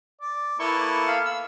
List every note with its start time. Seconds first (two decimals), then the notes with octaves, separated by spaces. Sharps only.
0.21 D5
0.59 A#3 B3 E4 A4 C#6
1.08 F5 B5
1.25 E6